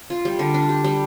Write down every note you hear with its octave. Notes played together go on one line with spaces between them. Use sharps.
F4
G3
D3
D4
G4
G3